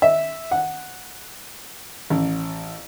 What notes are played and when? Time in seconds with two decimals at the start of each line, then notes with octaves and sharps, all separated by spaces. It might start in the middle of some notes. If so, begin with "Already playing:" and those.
0.02 E5
0.51 F#5
2.10 A1